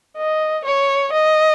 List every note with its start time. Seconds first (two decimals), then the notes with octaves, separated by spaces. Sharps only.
0.17 D#5
0.65 C#5
1.13 D#5